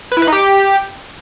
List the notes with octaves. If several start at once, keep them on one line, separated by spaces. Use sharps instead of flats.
B4
E4
B4
D#4
G4